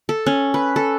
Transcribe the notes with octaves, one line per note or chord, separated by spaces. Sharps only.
A4
C#4
B4
A4